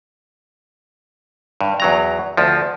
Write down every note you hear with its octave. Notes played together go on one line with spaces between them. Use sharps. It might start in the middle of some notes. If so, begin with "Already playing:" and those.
G2
E2 F#3 A#5
D2 F3